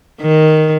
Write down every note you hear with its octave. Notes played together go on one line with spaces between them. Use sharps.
D#3